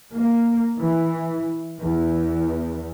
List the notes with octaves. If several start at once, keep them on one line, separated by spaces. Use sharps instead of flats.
A#3
E3
E2